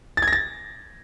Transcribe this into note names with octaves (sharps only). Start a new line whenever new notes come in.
A6
G#6
A#6
A6